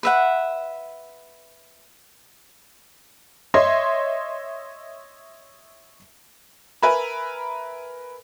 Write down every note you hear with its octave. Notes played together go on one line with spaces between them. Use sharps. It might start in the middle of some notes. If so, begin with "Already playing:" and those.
B4 E5 F#5
C#5 D#5 E5 C6
A#4 B4 E5 G#5 A#5 B5